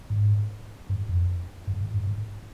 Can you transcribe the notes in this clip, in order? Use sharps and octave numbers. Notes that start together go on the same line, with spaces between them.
G#2
G2
F2
G2
G#2
G2
G#2